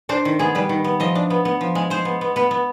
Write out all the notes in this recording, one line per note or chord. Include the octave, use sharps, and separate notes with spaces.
D4 C5
D#3
B3 G#4
G3 B4
D#3
B3
F3 D#5
D4
B3
B3
F3
G#3
G#3 C5
B3
B3
B3 B4
B3